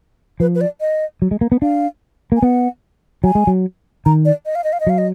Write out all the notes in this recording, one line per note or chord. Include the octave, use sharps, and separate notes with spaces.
F3 B4
B4
D5
D#5
F#3
G#3
A#3
B3
D4 F5
A#3 G#5
B3 F#5
F#3 G#5
G#3
F#3
D#3 A#5
D5
D#5
F5
D#5
F5
D#5
F#3 F5
D#5